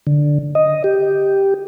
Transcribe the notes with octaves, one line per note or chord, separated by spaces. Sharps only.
D3
D#5
G4